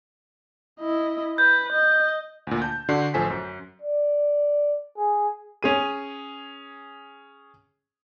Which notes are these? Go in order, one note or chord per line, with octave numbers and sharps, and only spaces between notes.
E4 D#5
B4 G6
D#5
D2 A#2
A5 G6
D3 D4 F#4 C6 C7
A1 F3 A4 C5 G#5 B6
F#2
D5
G#4
C#4 G#4 D#7